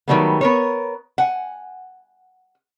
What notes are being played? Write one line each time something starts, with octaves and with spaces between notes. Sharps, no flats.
D#3 E3 F#3 G3 A3 B3
B3 A#4 C#5
F#5 G#5